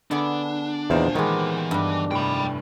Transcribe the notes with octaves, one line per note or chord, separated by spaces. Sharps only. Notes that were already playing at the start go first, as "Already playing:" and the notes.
D3 B3 D4 G#4
G#1 E2 A#2 D#4 C5
D#3 E3 G#3 B3 G4
G2 D4
F1 A2 G5 B5